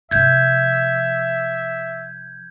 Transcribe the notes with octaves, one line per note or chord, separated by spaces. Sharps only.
C3 F3 E5 G6 G#6